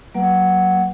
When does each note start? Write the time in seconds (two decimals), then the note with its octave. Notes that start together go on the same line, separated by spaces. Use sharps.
0.14 F#3 A#3 B4 F#5